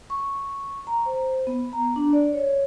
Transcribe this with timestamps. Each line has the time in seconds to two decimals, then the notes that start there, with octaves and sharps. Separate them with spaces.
0.10 C#6
0.87 A#5
1.06 C5
1.47 B3
1.73 A#5
1.96 D4
2.13 D5
2.33 C#5